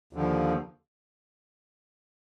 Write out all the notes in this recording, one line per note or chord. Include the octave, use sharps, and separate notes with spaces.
D#2 D3 F3